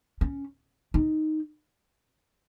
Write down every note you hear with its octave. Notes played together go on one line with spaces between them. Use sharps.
C#4
D#4